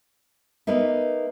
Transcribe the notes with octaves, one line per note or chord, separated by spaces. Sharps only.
A#3 B3 D#4 E5